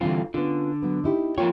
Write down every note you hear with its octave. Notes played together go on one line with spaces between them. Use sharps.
G2 D3 E3 C4 F4
D3 B3 C#4 F4
F#3 B3
D#4 E4 G4
F3 A#3 F4 C#5 G5